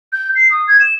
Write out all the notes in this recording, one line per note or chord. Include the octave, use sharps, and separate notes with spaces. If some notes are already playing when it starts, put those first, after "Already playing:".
G6
C7
D#6
G#6
E7